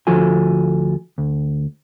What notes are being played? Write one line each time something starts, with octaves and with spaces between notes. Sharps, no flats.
D2 F3 F4 F#4 A4 G#5
D2